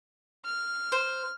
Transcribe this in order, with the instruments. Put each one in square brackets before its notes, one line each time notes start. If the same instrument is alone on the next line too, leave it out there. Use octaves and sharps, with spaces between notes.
[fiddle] F6
[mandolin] C5